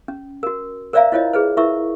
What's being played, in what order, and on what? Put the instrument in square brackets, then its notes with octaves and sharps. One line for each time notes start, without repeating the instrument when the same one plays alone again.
[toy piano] C#4
F#4 A#4
A#4 C5 D5 E5 F5 A#5
E4 F4 C5 C#5 D#5
G#4 B4 C5
E4 A#4 E5 C#6